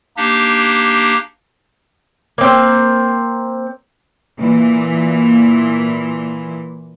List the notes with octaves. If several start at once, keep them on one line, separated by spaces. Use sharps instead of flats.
A#3 D4 D#4 G4
A#3 C4
A#2 E3